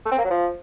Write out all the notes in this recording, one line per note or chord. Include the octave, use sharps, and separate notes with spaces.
A3
C4
A#3
F#3
F3